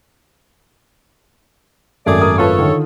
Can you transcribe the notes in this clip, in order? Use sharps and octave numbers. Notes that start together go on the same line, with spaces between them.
G#1 F#2 A3 G#4 D5
A#4 G#5 D#6
F4 A4 B4 C#5 A5
D3 D#3 F4